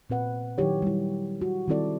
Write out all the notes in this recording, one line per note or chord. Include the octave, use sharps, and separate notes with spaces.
A#2 C4 B4 F#5
D#3 F#3 D#4 E4 G4 C#5
G3 E4
F#4
D#3 G3 C4 E4 A4 D5